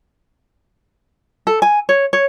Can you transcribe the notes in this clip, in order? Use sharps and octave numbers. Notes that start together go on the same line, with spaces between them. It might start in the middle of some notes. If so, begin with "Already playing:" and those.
A4
G#5
C#5
C#5